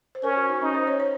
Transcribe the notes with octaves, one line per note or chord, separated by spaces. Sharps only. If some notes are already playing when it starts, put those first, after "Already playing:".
C5
C#4 A#4
F#4
D#4
C#4 D#4
C5
C#5
C#5